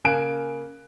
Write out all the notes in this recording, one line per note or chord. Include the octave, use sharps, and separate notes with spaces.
C#3 A#3 F5 G#5 F#6 D7